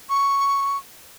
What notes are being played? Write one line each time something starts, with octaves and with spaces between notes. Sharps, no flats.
C#6